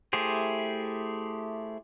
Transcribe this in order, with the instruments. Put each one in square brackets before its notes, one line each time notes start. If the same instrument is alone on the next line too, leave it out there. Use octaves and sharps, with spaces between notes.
[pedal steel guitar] A3 E4 G4 G#4 C5